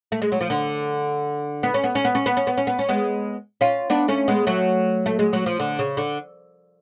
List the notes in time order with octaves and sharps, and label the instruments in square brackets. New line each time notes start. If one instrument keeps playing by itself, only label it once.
[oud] A3
G#3
F#3
F3
D3
B3
C#4
B3
C#4
B3
C#4
B3
C#4
B3
C#4
B3
C#4
G#3 B3
C#4 F4
B3 D4
A3 C#4
G#3 B3
F#3 A3
A3
G#3
F#3
F3
D3
C#3
D3